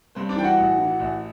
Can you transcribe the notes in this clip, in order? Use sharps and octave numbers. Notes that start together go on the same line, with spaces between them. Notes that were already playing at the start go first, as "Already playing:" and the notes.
G2 C4 C5
D4 D5
E3 G5
F#4 F#5
A1
E3
A1